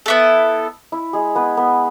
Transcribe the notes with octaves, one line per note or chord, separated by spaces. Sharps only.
B3 E4 A4
E4
G#3 G#4
B3 B4
B3 B4